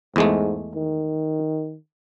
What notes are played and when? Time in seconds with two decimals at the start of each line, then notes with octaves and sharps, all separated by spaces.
0.16 E2 G#2 G#3 A3
0.75 D#3